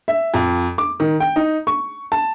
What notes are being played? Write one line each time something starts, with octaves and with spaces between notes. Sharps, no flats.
E5
F2
D6
D#3
G5
D#4
C#6
A5